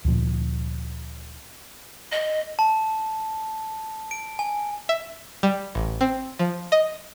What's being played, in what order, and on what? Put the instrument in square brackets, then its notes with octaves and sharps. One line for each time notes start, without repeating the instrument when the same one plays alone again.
[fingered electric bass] D2 A#2 F3
[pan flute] D#5
[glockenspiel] A5
D7
G#5
[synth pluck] E5
G3
A1
C4
F3
D#5